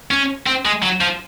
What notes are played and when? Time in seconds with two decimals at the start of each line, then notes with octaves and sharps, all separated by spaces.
0.11 C#4
0.46 C4
0.65 G#3
0.83 F#3
1.01 F3